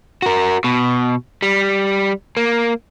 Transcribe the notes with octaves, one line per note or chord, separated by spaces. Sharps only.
F#4 A#4
B2
G3
A#3